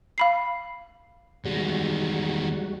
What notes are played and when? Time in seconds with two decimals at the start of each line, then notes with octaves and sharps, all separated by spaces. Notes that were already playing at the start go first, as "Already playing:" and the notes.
0.18 F5 B5 C7
1.45 E2 D#3 G3 G#3 F#4